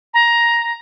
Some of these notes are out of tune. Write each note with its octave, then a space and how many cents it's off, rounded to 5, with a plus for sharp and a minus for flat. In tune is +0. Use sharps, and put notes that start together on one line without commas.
A#5 +10